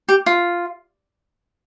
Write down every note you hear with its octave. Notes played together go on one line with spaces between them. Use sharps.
G4
F4